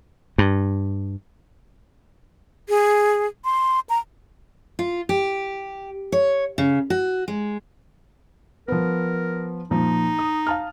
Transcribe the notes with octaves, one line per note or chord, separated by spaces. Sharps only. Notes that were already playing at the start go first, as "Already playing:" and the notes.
G2
G#4
C6
A#5
F4
G4
C#5
C#3
F#4
G#3
F3 B3 A#4
A#2 F3 D#4
D#6
F5 A5 F6